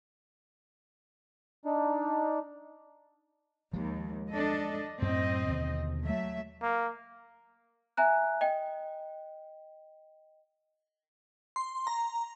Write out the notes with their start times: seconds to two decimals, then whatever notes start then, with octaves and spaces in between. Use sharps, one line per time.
1.65 D4 D#4
3.73 D#2 F3 G#3
4.29 D4 A4 D#5
5.02 F#2 A2 C4 D#5
5.48 D#2 B2 D3
6.02 F#3 A3 E5
6.63 A#3
7.97 E5 G#5 A#5 F#6
8.41 D#5 G5
11.56 C6
11.87 A#5